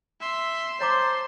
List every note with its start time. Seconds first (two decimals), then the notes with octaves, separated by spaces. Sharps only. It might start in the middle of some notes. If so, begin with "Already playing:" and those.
0.21 E5 C6
0.81 C5 C#5 A5 A#5 D6